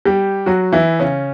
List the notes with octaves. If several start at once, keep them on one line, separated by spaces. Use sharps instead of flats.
G3 G4
F#3 F#4
E3 E4
C#3 C#4